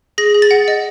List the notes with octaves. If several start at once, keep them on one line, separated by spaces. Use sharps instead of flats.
G#4 A#6
G#4
A6
F#5
D#5